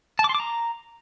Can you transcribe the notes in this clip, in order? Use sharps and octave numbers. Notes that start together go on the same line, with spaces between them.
A5
D6
C6
D6
A#5